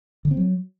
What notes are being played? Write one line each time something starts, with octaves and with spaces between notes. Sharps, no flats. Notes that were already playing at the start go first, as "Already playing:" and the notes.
D3
C4
F#3